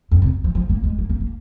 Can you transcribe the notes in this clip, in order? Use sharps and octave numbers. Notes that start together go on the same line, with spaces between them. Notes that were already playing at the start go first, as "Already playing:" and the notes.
F2
C3
E3
F3
A#3
G#3
A#3
A#3
A#3